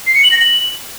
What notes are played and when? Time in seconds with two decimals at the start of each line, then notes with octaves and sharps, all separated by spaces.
0.07 C7
0.15 C#7
0.23 F#7
0.31 A#6
0.40 F#7